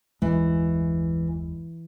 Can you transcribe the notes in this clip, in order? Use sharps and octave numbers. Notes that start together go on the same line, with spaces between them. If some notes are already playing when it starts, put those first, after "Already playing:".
F#1 D#2 E3 G#3